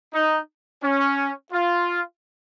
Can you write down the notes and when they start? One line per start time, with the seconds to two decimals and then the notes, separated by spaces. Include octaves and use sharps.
0.14 D#4
0.83 C#4
1.53 F4